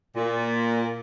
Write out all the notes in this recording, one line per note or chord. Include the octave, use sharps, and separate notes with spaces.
A#2